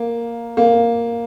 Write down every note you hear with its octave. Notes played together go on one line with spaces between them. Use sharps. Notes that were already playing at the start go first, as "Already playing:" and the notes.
Already playing: A#3
A#3